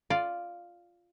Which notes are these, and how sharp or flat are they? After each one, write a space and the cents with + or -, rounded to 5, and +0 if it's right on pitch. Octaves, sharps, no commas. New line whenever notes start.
F4 +0 D5 +0